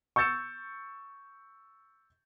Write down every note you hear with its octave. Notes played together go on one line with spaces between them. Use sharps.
C#6 E6 G6 A6 C#7 E7